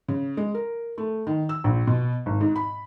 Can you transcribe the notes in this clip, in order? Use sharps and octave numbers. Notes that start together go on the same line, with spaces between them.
C#3
G#3
A#4
A3
D#3
E6
A#1
B2
G#1
G#2
B5